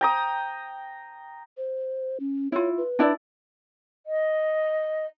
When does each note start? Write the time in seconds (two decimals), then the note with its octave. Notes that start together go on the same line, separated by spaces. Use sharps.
0.01 G5 A#5 D#6
1.57 C5
2.20 C#4
2.52 E4 F4 C#5
2.78 B4
2.99 D4 E4 D5
4.06 D#5